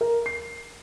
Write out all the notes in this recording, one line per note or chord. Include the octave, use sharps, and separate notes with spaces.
A#4
C7